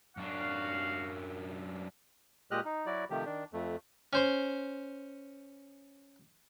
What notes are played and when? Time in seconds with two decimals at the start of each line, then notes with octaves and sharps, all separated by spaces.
0.17 F#2 D4 F#4 F5
2.51 A#2 G#3 G4 D#5 F6 F#6
2.65 D#4
2.86 F#3 E4 F#4 D5
3.10 C3 D#3 F3 A3 G4
3.25 D#3 D4
3.53 F2 A3
4.13 C#4 C5 C6